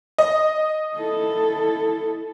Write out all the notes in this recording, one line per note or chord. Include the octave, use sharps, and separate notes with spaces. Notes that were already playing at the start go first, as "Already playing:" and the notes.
D#5
E4 A4